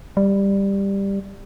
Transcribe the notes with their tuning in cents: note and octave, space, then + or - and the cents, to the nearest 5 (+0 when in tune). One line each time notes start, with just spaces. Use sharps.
G3 +10